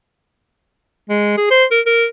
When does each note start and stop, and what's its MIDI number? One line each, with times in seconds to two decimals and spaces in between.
1.09 1.35 56
1.37 1.49 68
1.51 1.64 72
1.71 1.80 70
1.86 2.06 70